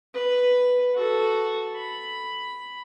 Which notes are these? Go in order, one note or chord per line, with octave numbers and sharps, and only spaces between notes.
B4
F#4 A4
B5